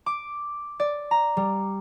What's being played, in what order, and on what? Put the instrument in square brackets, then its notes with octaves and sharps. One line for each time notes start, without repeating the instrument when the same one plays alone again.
[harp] D6
D5
A#5
G3